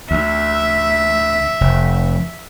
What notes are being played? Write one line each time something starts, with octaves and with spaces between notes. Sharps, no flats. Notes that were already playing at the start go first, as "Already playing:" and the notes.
D2 E5
F1